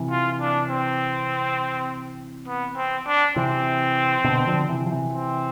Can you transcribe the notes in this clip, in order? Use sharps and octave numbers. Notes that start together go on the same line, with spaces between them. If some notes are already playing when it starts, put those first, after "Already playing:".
Already playing: C3 E3
F4
D4
C4
B3
C4
D4
C3 E3 C4
B2 D3
D3 F3
C3 E3
F3
C3 E3
C4